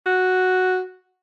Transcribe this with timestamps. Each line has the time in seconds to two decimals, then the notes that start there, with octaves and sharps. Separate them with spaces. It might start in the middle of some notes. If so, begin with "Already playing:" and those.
0.06 F#4